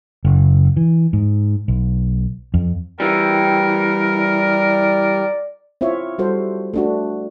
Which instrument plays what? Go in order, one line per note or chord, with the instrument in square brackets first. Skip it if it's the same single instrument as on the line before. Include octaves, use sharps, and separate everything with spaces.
[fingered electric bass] F#1
E3
G#2
B1
F2
[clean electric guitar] E3 G3 [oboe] A#4 [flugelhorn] G5
[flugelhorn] D5
[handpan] C4 E4 F4 C#5 E5
G3 F#4 A4 C5
A3 D4 F#4